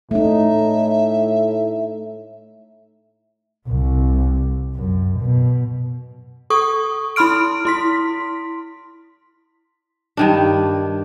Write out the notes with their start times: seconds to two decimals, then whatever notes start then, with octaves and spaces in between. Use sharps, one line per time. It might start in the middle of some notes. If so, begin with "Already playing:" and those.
0.11 A2 A3 D#4 E5
3.68 C2
4.75 F#2
5.19 B2
6.50 A4 C#6 D#6
7.16 E4 B5 C6 F6 D7
7.65 E4 C6 B6
10.17 G2 D#3 D4